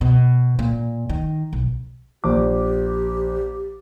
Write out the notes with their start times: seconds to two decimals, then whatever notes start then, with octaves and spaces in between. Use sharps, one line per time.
0.01 B2
0.59 A#2
1.09 D#3
1.53 B1
2.24 A#1 G4 D6